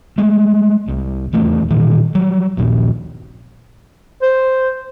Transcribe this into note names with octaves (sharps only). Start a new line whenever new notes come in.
G#3 A3
C2
D#1 E2 A3
A#2 D#3 E3
F#3 G3
A#1 D#2 A#2
C5